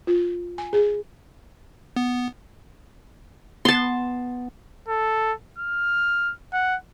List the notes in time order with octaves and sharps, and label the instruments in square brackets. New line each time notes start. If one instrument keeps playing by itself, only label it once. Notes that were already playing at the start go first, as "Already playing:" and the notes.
[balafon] F4
G#5
G#4
[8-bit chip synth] B3
[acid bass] B3 [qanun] A5 C6
[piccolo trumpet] A4
F6
F#5